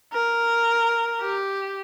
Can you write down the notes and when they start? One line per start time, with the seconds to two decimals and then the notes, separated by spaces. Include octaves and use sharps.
0.13 A#4
1.21 G4